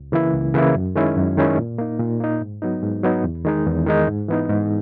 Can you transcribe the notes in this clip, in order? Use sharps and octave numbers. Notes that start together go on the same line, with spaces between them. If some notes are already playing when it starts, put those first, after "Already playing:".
Already playing: C#2
C#3 E3 A#3 E4
C#2
C#3 E3 A#3 E4
F#2
D#3 G#3 C#4 E4
F#2
D#3 G#3 C#4 E4
A#2
A#3 D#4
A#2
A#3 D#4
G#2
F#3 B3 D#4
G#2
F#3 B3 D#4
E2
D#3 G#3 D#4
E2
D#3 G#3 D#4
G#2
E3 B3 D#4
G#2